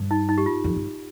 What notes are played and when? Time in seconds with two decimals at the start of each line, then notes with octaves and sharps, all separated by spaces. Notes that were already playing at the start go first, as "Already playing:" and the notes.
Already playing: G2
0.11 D#4
0.29 D#4
0.38 G4
0.46 F4
0.64 F2
0.76 G2